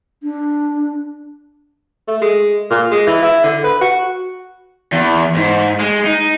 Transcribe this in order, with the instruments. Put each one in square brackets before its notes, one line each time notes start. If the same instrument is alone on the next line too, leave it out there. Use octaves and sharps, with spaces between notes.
[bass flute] D4
[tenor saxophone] A3
G#3
A#2
G#3
E3
E4
D3
B4
F#4
[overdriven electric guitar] E2
G#2
G#3
D#4